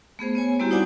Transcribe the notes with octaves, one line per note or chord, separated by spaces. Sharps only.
A3 B3 G#4 C5
B3 C#5 G#5
G3 A#3 C4 E4 F#4 G4
D#4 C5 D5 F#5 G#5 D6